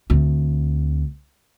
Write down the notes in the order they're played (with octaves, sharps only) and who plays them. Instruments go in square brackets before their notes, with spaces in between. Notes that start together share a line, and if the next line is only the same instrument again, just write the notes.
[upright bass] D2 C4